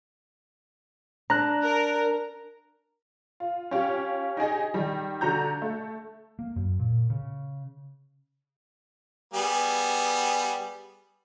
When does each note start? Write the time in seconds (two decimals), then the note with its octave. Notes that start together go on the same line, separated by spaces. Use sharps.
1.30 D4 A#5 F#6
1.64 A#4
3.40 F4
3.71 C#4 F4 G4
4.37 D#4 G4 G#4 D#5
4.74 D#3 G3
5.21 D3 F#4 A#5 G6
5.62 A3
6.39 A#3
6.56 F#2
6.79 A#2
7.10 C#3
9.34 G3 B3 G#4